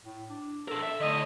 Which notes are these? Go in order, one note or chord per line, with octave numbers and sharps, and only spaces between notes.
A2
D4
D4 A4 A#4
E5
A2 D3 D#5